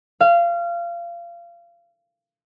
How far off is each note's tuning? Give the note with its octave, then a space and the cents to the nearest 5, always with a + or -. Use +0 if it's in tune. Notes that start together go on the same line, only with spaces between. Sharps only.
F5 -25